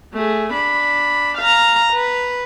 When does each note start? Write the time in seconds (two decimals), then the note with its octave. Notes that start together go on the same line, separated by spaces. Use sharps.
0.14 A3 G#4
0.52 D4 B5
1.37 F5 A#5
1.92 B4